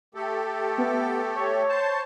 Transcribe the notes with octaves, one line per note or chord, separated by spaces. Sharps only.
A3 G4 A4
B3
C#5
C5 A5